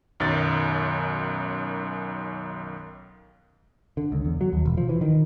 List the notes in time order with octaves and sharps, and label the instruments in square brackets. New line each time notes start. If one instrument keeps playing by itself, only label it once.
[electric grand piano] B1 F#2 D#3 A6
[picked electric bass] D3
C#2
E2
F#3
D#2
E1
F3
E3
D#3